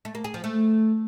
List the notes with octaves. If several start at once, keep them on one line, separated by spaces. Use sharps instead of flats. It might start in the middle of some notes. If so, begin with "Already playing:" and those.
A3
A#3
G#4
F3
A3